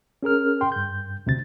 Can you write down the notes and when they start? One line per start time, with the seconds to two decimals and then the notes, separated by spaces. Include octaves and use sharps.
0.23 C#4 G#4 A#4 F6
0.61 G5 C6
0.72 G2 G6
1.27 D2 C3 A6